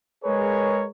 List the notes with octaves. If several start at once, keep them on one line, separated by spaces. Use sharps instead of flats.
G#3 G#4 A#4 B4 C#5